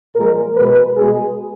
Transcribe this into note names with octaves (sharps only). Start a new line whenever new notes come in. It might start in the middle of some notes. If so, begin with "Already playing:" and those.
A#2 F3 G#3 A#4
B2 G#3 B4
B2 G#3 G#4